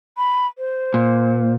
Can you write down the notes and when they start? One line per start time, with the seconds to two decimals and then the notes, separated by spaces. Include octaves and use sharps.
0.17 B5
0.58 C5
0.94 A#2